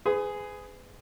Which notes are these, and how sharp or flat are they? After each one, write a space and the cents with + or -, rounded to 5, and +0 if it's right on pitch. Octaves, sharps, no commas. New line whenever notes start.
G#4 +0 B4 +35